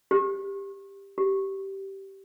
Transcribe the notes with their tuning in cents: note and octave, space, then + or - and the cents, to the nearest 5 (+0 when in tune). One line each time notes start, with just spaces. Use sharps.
G4 +10
G4 -15